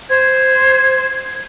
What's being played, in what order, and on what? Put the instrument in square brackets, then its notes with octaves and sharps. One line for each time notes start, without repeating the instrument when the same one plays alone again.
[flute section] C5 G#6